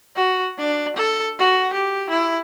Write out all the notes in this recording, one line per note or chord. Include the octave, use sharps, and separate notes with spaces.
F#4
D4
A4
F#4
G4
E4